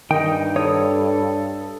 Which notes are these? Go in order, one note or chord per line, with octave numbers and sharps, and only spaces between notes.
G2 D#3 D#4 G5
A4 C#5 D#6